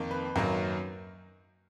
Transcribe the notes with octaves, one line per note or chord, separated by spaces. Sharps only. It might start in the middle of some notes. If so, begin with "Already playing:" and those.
Already playing: F2 D#3 A#3
B4
F#2 D#3 F#3 A#3